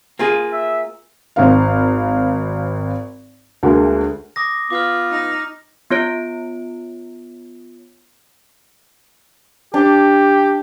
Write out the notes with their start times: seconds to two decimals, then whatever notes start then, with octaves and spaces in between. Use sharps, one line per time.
0.19 A#3 F4 G#4
0.53 E5
1.36 G#1 C4 F5
3.63 D2 G#3 A#3 F#4
4.36 D6 D#6 A#6
4.70 B3 F4 D6 F6
5.11 D#4
5.90 B3 F4 C#5 D7
9.74 D4 G4